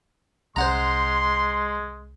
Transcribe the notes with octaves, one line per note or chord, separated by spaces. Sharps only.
C2 G#3 C#4 C5 F#5 A#5 C6